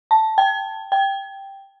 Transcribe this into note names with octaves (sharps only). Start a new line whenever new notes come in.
A5
G5
G5